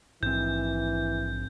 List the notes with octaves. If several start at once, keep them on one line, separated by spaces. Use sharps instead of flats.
A#1 G#2 E3 C4 G6